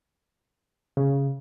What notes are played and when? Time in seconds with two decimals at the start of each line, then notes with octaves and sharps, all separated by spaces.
0.97 C#3